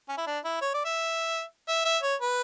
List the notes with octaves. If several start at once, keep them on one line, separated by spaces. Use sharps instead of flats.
C#4
E4
D4
E4
C#5
D5
E5
E5
E5
C#5
B4